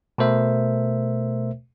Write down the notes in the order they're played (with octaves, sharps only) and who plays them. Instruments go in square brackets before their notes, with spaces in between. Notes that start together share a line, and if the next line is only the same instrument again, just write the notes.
[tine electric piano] B2 A3 A#4 C5 E5